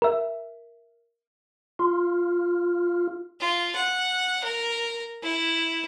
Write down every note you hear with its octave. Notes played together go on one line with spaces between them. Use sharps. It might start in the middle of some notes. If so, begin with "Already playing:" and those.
A#4 E5
F4
F4
F#5
A#4
E4